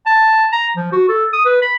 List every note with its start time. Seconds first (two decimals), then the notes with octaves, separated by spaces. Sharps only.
0.06 A5
0.53 A#5
0.76 F3
0.92 F#4
1.09 A4
1.33 D#6
1.46 B4
1.62 B5